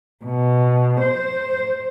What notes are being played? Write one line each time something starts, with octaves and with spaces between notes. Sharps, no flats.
B2
C5